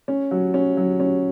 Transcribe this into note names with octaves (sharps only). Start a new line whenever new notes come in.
C#4
F#3
C#4
F#3
C#4